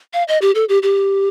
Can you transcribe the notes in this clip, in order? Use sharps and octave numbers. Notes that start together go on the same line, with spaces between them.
F5
D#5
G4
A4
G4
G4